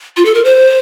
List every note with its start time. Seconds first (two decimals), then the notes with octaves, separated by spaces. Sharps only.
0.17 F4
0.25 A4
0.34 A#4
0.45 C5